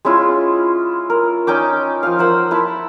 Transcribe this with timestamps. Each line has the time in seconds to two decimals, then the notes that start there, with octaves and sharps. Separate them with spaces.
0.05 G#3 C#4 E4 F4
1.10 A#4
1.47 C#4 D#4 G5 D6
2.03 F3 F5
2.19 A#4 C5 F#5 E6
2.51 E4 A5 B5